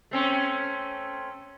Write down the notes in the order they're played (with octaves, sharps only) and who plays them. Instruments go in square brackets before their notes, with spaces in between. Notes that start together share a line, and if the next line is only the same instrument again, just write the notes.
[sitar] A3 C4 C#4